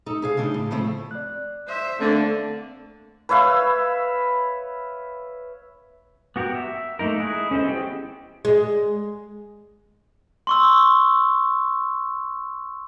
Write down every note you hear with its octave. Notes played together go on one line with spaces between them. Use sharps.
D#4 A4
C3 G#4 F5
C#3 G#3 D4 D#4
A2
C#3 F3 A3 C4
D5 F#6
C5 E5
D3 A3 A#3 C4 C5 D5
B4 C#5 E5 F5
B3 F#4 G4 A#4
E5
A3 A#3 D#4 A#4
G#3 E4 G#4 F#6
C#4 A4 C5 D#5
B3 E4 G4 G#4 G5
G#3
C6 C#6 E6